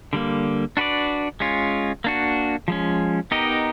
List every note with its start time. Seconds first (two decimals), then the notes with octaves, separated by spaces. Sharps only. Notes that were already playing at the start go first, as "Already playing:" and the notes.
0.13 D3 G3 A#3
0.77 D4 F#4 B4 D5
1.40 G#3 C#4 F4
2.04 A#3 D4 F#4
2.68 F3 G#3 C#4
3.31 B3 D#4 G4 A#4 D#5